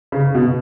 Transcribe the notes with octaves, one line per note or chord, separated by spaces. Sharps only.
C#3
B2